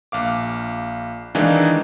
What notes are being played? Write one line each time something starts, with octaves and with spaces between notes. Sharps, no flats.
A#1 F5 D6
D#3 E3 G#3 D4 D#4 F5